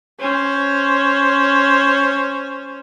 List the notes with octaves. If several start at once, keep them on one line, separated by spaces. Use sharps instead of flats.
C#4 C5